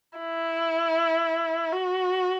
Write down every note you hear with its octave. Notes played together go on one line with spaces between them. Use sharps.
E4
F#4